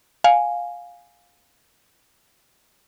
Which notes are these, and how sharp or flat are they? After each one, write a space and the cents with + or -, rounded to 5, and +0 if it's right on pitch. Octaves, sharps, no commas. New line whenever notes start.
F5 +15 G#5 +0